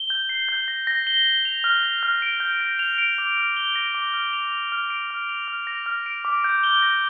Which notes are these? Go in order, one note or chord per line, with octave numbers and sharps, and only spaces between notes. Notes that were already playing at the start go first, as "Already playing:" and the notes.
Already playing: G7
G6
C7
G6
A#6
A#6
G7
G7
F7
F6
A#6
F6
D7
G6
A#6
F7
D7
D6
F6
G7
A#6
D6
F6
F7
F7
F6
D7
F6
F7
F6
A#6
F6
D7
D6
G6
G7
A#6